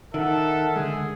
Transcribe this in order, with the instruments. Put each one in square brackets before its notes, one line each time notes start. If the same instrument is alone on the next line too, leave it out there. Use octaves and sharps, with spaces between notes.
[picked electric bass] D#3 [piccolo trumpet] A4 [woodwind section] A#4 E5 F#5
[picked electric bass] D3 G#3 [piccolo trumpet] G#4